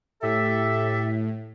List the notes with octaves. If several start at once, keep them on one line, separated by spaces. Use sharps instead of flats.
A2 G4 A4 E5